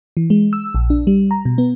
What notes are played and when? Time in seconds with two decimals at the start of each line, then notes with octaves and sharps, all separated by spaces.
0.17 E3
0.30 G#3
0.53 E6
0.75 A#1
0.90 D4
1.07 G3
1.31 A#5
1.45 B2
1.58 B3